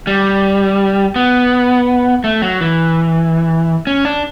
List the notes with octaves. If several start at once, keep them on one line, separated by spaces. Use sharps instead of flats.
G3
B3
A3
F#3
E3
C#4
D4